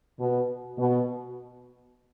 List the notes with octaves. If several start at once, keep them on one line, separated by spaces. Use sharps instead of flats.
B2
B2